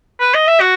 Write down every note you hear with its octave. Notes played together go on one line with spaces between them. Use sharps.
B4
D#5
E5
F#4